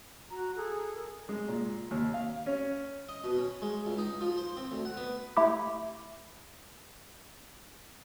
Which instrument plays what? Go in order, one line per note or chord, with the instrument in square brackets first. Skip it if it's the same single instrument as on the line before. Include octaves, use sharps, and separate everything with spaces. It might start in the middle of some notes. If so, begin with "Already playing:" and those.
[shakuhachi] F#4 [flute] A#5
[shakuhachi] G#4 [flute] A4
[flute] A#4
[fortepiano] G#3
A#2
D#2
F5
C#4
[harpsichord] D#5
B2
C#4
G#3
C#2
D#4
F3
C5
C4
D2
F#5
B3
[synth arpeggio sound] A3 E4 G4